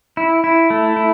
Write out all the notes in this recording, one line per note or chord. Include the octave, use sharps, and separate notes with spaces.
E4
E4
A3
E4